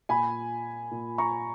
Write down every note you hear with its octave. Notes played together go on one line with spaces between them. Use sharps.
A#2 G#5 B5
A#2
A#5 C#6